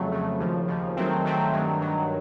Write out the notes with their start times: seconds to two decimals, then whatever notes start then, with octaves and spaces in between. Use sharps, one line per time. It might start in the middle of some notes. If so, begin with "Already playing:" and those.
Already playing: F2 C#3 F#3 A3
0.12 F2 C#3 F#3 A3
0.40 D#2 C#3 F3
0.68 D#2 C#3 F3
0.97 D#3 F#3 A3 C4
1.25 D#3 F#3 A3 C4
1.53 G2 D#3 F#3
1.81 G2 D#3 F#3